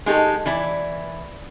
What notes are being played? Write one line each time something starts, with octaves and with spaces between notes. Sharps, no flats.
G#3 D#4 G4 A4
E3 E4 D5